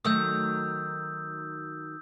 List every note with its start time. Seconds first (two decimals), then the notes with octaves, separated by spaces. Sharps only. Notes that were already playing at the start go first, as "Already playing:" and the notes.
0.05 D#3 F#3 A3 D#6 E6 G6